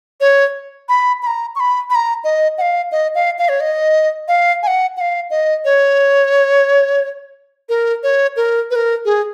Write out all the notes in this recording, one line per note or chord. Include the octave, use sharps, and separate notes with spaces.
C#5
B5
B5
A#5
C#6
B5
B5
A#5
D#5
F#5
F5
D#5
F5
F5
C#5
D#5
F5
G#5
F#5
F#5
F5
D#5
C#5
A#4
C#5
A#4
B4
A#4
G#4